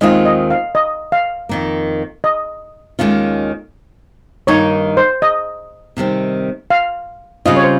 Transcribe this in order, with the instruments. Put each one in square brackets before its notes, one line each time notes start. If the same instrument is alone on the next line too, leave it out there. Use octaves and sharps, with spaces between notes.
[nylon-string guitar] D#2 D#3 G#3 C4 F4 [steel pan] D#5
[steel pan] D#5
F5
D#5
F5
[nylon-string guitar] F2 D#3 A#3
[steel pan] D#5
[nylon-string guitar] D#2 D#3 G#3 C#4 F4
[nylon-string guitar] G2 D#3 A#3 D#4 [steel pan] C#5
[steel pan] C5
D#5
[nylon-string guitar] C3 D#3 G3 C4
[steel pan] F5
[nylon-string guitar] C#3 G3 C4 F4 [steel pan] D#5
[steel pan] C#5
C5